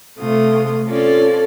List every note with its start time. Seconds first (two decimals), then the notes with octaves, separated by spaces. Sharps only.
0.18 C3 A3 F4 D#6
0.86 C4 C#4 F4 A4 C#5 D5